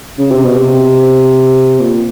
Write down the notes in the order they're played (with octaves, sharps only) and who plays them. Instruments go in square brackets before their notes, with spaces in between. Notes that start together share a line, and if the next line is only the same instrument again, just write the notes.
[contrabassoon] C#3
C3
B2
C3
A#2